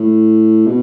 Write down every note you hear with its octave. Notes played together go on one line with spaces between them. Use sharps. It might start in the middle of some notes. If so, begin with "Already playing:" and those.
Already playing: A2
B2